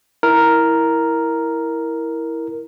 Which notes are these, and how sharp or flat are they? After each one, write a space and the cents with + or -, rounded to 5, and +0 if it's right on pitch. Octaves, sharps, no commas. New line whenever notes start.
E4 -10 A#4 +0